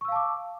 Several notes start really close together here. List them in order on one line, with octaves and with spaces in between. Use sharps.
C#6 E6 F5 A5 D6